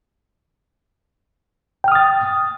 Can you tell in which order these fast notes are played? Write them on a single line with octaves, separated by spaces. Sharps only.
G5 F6 D#6 A6